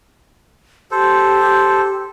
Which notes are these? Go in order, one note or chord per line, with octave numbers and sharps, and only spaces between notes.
G4 A4 C5